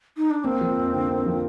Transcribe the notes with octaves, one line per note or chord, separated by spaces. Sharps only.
D#4
D4
A#3 C4
F3
F2
D3
A#3
F3